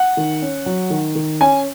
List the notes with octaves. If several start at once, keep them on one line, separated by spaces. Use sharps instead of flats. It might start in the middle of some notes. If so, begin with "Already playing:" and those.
Already playing: F#5
D#3
C#4
F#3
D#3
D#3
C#4 G#5